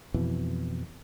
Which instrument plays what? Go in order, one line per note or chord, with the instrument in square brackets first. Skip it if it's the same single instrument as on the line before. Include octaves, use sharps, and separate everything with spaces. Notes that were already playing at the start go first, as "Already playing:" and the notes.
[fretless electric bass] F2 B2 E3